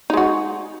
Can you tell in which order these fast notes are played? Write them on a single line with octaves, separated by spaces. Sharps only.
D#4 G#3 F#4